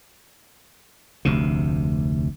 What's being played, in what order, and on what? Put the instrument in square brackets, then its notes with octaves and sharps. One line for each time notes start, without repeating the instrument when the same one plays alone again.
[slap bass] F1 D2 C3